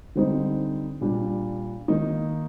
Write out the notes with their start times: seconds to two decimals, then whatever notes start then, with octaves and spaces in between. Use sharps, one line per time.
0.15 D3 G3 C4 D#4
1.01 A#2 G3 D4
1.88 D#3 A#3 D#4